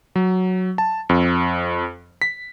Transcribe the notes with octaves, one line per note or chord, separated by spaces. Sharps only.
F#3
A5
F2
B6